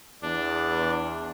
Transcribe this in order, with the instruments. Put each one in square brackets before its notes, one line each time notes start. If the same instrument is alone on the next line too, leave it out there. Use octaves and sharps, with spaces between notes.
[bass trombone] E2 [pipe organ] D4